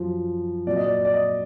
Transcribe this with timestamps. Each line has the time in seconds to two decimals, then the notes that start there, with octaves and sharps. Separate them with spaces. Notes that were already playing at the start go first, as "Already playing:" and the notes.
Already playing: F#2 F3
0.67 A#2 F#3 D5
0.76 D#5
0.86 D5
1.05 D5
1.14 D#5